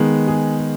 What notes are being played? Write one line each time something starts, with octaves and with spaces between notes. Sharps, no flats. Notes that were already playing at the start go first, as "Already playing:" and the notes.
Already playing: D#3 G#3 B3
G#4